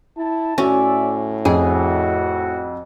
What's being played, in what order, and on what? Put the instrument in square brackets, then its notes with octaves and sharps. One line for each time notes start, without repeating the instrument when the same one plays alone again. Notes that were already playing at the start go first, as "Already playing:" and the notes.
[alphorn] E4 [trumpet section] A5
[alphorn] A2 [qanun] C#4 [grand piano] F#4 [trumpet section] A4 D5 E5
[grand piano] F2 [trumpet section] E4 F#4 [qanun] G#4